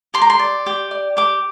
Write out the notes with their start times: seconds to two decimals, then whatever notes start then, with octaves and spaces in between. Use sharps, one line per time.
0.14 G4 C6
0.22 A#5
0.30 C6
0.39 D5
0.66 G4
0.91 D5
1.17 G4 D6